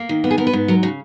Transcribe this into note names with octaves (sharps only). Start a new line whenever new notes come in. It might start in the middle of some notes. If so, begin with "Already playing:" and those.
Already playing: A#3
D#3
B3
G#4
B3 A#4
B4
G#2
F#3 A#4
C#3 F#4